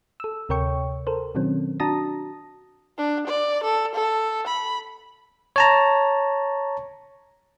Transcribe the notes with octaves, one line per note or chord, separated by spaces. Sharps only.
A4 E6
D2 C3 A#4 C#5 G5 C#6
A4 A#4 C5
B2 D#3 F#3 C4 C#4
D4 F#4 A5 A#5 D#6 A#6
D4
D5
A4
A4
B5
C#5 A5 A#5